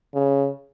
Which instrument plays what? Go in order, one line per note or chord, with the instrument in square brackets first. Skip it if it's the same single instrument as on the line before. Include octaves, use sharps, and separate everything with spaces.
[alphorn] C#3